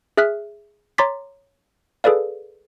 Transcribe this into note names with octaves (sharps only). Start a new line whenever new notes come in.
G#4 E5 F6 F#6 B6
C#5 A#5 C6 D6 A6 B6
G#4 A4 B4 D5 F5